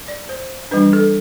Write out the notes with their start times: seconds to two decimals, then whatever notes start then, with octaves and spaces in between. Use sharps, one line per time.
0.08 D5
0.29 C5
0.71 E3 G3 D4 B4
0.93 A4